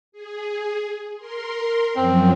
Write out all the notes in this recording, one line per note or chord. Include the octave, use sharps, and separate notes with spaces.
G#4
A#4 C6
F#2 F3 F#3 C4